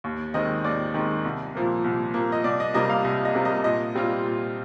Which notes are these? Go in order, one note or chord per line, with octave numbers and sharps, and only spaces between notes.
D#2
D#3 G#3 C4 D#5
D#2 D5
D#3 G#3 C4
C2
A#2 F3 A#3
C2
A#2 F3 A#3
D#5
C2 D5
D#5
C3 G3 A#3 D#5
F5
C2 D#5
D#5
C3 G3 A#3
D#5
A#2 D#5
G3 C4 F4
A#2